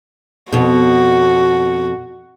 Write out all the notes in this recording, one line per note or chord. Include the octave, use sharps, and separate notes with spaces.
F2 B2 F#4